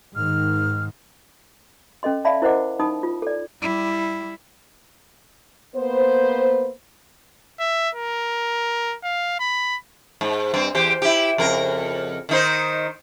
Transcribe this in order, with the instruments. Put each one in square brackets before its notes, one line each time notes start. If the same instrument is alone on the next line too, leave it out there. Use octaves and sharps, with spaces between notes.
[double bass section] G#2 D#3 [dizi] F6
[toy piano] C#4 A4 D#5 C6
D5 E5 F5 A5 B5
E4 A#4 C5 D#5 F#5 D6
D#4 A5 B5 D#6
F4
A4 D5
[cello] G3 E4
[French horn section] A#3 B3 B4 C5
[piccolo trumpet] E5
A#4
F5
B5
[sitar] G#2
G2 C4
E2 G4 C5
E4 G4
F2 C#3 A#4
D#3 D#4 C5